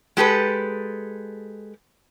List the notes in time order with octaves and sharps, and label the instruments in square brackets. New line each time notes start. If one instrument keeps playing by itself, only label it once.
[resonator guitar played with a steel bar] G#3 G4 A4 B4